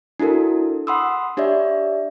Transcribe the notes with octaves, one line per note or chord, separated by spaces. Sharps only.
D4 E4 F#4 A4 A#4
F#5 B5 C6 D#6 E6
D4 G4 C#5 D5 E5